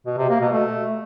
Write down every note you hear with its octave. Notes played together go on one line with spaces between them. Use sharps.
B2
C3
A#3
B2
A3